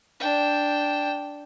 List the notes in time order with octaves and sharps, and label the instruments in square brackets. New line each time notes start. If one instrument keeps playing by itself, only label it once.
[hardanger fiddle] D4 G5